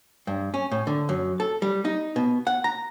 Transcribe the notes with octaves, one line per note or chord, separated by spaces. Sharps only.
G2
C#4
A2
D3
F#2
A4
G3
D#4
B2
F#5
A#5